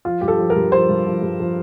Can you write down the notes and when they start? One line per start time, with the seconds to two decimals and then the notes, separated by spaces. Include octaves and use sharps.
0.05 F3 F4
0.21 G2 G4
0.28 A4
0.39 F3
0.50 A#4
0.56 G2
0.72 F3 C5
0.89 G2
1.07 F3
1.23 G2
1.40 F3